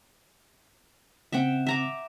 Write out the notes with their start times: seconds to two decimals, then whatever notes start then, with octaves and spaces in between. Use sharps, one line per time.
1.32 C#3 C4 E5 F#5 G5
1.66 E5 A#5 D6